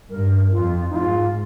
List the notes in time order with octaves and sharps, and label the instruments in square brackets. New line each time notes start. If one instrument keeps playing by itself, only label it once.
[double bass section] G2 [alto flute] A#4
[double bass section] F2 [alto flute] F4
[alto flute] D#4
[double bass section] G#2 [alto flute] F4